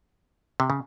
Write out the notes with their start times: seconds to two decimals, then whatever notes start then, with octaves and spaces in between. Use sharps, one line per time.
0.60 C3
0.70 C#3